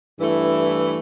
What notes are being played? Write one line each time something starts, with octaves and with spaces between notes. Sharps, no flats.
G2 E3 A3 E4